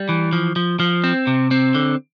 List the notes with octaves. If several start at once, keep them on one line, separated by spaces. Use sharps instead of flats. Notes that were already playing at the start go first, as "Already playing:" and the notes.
Already playing: G3
E3
F3
F3
F3
C4
C3
C4
D3